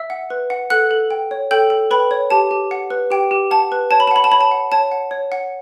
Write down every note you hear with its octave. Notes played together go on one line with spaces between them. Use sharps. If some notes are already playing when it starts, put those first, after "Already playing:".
Already playing: E5 E6
F#5
B4
F#5
A4 F#5 F#6
A4
G5
C#5
A4 G5 G6
A4
B4 G5 B5
C#5
G4 A5
G4
F#5
B4
G4 G5
G4
F#5 A5
B4
C#5 A5
B5
A5
F#5 B5
A5
C#5 B5
A5
F#5
C#5 A5
F#5
C#5
F#5